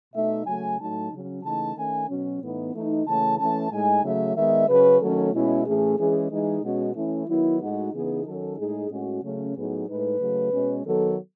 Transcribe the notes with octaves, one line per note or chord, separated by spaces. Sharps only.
B2 A3 D#4 E5
C#3 F#3 A3 G#5
A2 F#3 A3 D#4 A5
C#3 F#3 C#4
C#3 E3 A3 D#4 A5
D#3 A3 C#4 G#5
B2 F#3 C#4
A2 E3 B3 D#4
E3 A3 D#4
C#3 E3 A3 C#4 A5
E3 A3 C#4 A5
A2 G#3 D#4 G#5
C#3 F#3 A3 E5
D#3 G#3 B3 E5
C#3 F#3 C#4 B4
D#3 F#3 A3 C#4 A4
B2 G#3 C#4 E4
A2 E3 A3 C#4 G#4
E3 G#3 C#4 G#4
E3 G#3 D#4 G#4
B2 G#3 C#4 F#4
E3 A3 C#4 E4
D#3 F#3 B3 E4
A2 G#3 D#4 F#4
C#3 E3 B3 D#4 G#4
D#3 F#3 C#4 A4
A2 G#3 D#4 G#4
A2 G#3 C#4 F#4
C#3 F#3 A3 C#4
A2 F#3 B3 D#4 G#4
A2 G#3 D#4 B4
C#3 F#3 A3
B2 G#3 C#4
D#3 F#3 B3 A4